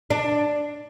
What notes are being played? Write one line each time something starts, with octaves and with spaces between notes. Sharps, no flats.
D4